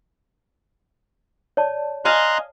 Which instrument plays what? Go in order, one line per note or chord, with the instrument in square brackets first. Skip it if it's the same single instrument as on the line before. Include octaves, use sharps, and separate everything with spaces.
[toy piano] C#5 D5 A5
[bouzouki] D#5 F5 G#5 [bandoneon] A#5 C6 F#6